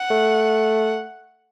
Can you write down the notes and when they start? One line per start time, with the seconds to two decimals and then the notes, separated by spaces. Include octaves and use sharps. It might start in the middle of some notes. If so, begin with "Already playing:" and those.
Already playing: F#5
0.11 A3